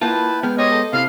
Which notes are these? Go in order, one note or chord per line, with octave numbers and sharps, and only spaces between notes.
A#3 E4 F4 B4 G5 A5
G#3 B3 G5 F6
G4 C5 C#5 D#5
A4
C3 E4 F5